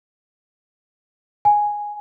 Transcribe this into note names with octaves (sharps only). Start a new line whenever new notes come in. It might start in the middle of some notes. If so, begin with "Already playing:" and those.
G#5